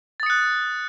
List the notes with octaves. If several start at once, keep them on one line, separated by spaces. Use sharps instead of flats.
D#6 F#6 A6 C#7